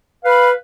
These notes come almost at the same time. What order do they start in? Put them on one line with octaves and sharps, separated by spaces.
B4 F5 B5